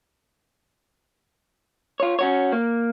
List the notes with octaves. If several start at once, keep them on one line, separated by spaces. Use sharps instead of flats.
F4 C#5
C#4 F#4 C#5
A#3